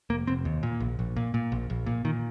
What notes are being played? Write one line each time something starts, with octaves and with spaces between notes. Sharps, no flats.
F1 A#3
F1 C4
D#2
A#2
A#1
A#1
A#2
A#2
A#1
A#1
A#2
A#2 D#3